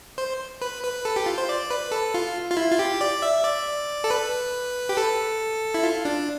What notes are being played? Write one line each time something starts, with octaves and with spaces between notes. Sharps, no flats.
C5
B4
B4
A4
G4
F4
C5
D5
B4
A4
F4
F4
E4
F4
G4
D5
E5
D5
A4
B4
G4
A4
E4
F4
D4